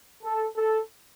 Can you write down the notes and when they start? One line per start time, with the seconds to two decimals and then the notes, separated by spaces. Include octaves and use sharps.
0.23 A4
0.56 A4